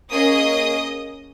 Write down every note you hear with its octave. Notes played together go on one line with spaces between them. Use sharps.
A#3 C#4 G#4 D#5 D#6